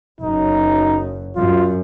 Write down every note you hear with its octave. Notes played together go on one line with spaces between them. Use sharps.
F#1 F#2 D#4
F#2 F4